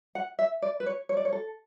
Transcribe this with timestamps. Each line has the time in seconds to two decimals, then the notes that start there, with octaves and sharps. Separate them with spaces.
0.15 F#5
0.39 E5
0.62 D5
0.80 B4
0.86 C#5
1.09 C#5
1.17 D5
1.25 C#5
1.33 A4